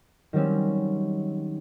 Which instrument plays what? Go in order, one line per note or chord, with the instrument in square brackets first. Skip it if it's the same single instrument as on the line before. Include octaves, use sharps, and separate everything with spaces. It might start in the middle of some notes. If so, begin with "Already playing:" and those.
[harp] D#3 F#3 G3 C4 C#4